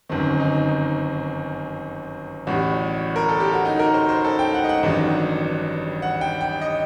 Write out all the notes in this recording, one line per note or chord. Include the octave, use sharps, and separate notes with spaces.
G1 F#2 D#3 C4
D#4
C4
D#4
A1 A2 G3 F#4
A#4
A4
G4
F#4
D#4
A#4
C5
C5
A4
G5
F#5
D#5
F#5
A1 G2 D#3 F#3
F#5
G5
G5
D#5